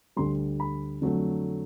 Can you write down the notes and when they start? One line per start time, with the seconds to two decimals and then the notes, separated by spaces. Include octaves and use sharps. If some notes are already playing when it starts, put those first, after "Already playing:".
0.16 D2 D3 G3 C6
0.60 B5
1.02 F2 D3 F#3 A3